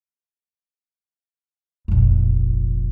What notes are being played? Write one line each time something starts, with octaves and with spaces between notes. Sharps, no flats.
F1 A#1